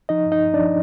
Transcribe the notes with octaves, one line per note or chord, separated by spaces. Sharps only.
F3 D#4 D#5
G2
D#4 D#5
G2
D4 D5
F3